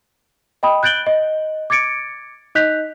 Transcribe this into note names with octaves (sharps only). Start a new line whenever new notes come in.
D#5 G5 B5 D#6
F#6 G6 A6 D7 F#7 G7
D#5
D6 G#6 A6 C#7 D7
D#4 D#5 F#6 G6 B6 F7